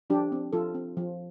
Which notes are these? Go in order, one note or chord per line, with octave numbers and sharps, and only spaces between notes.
F3 D4 G4
C4
F3 F4 A4
C4
F3